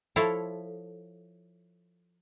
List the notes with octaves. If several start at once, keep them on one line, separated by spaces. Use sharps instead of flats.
F3 E4 A4 C#5 F5